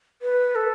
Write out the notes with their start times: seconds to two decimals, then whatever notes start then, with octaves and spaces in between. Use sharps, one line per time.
0.22 B4
0.55 A4